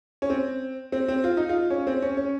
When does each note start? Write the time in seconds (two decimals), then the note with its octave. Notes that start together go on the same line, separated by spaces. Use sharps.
0.22 C#4
0.30 C4
0.92 C4
1.08 C4
1.24 F4
1.37 D#4
1.49 F4
1.70 C#4
1.87 C4
2.02 C#4
2.17 C#4